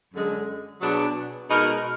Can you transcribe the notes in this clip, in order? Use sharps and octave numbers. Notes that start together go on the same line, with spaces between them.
F#2 D3 G#3
B2 F#3 B3 D4 G#4
B2 G#3 D#4 A#4